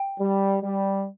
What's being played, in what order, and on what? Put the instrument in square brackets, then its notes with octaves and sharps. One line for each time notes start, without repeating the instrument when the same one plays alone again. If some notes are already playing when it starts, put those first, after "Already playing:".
Already playing: [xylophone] G5
[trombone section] G3
G3